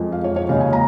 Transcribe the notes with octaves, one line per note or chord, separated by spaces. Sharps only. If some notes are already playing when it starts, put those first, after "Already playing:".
Already playing: F2 F3 G#3
F5
C#5
C#5
D#2 C#3 G#3 F5
G#5
A#5